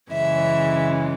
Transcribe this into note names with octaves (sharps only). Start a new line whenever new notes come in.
F#2 C#3 E3 G#3 E5